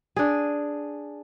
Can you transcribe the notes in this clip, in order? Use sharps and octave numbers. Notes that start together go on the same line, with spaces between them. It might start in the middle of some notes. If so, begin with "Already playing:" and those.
D4 G#4